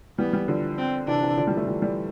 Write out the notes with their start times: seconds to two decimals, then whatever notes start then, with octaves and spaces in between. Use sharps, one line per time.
0.19 E3 G3 B3
0.33 E3 G3
0.48 D3 F3
0.78 C4
1.07 C3 E3 D4
1.23 C3 E3
1.37 D3 F3
1.47 E3 G3
1.57 F3 A3
1.67 E3 G3
1.82 E3 G3